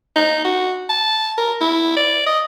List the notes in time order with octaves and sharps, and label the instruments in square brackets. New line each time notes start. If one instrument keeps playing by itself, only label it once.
[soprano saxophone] D#4
F#4
A5
A#4
E4
D5
D#5